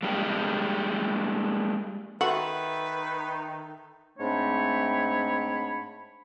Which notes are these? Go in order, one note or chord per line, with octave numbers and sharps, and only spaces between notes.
G3 G#3 A#3 D4 G4
D#3 F#4 A4 B4 E5 C6
G#2 A3 C4 D4 C#5 B5